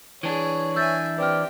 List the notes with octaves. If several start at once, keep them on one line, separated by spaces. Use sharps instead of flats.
E3 D4 G#4 C#5
E5 G#5 E6 G6 A6
C4 G4 B4 D5 F6